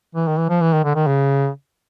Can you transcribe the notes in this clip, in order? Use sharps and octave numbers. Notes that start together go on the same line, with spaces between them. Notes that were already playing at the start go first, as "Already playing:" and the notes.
E3
D#3
E3
F3
E3
D#3
D3
D#3
C#3